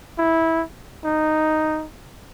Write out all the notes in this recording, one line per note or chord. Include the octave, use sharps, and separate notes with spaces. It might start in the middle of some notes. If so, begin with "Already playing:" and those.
E4
D#4